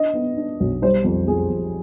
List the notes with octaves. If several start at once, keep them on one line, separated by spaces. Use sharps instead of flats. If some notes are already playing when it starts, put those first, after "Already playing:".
Already playing: D4 D#5
B3
D4
B1
G3 C5
F2
F2 G#4
F2